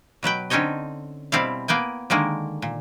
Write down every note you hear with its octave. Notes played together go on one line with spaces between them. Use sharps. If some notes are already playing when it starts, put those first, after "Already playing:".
B2 F#3 B4 G5
D3 C4 C#4 D#4 C#5 D#5
B2 G3 C4 E4 F5
A#3 B3 G5 G#5
D3 D#3 G#3 A#3
A#2